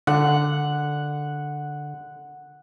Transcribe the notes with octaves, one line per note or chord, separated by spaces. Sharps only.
D3 F#5